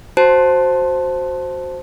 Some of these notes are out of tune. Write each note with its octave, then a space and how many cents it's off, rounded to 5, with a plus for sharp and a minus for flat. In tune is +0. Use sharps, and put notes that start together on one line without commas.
F#4 +0 C5 +0 A5 +0